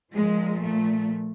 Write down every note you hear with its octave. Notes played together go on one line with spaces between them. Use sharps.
A#2 F3 G#3
A3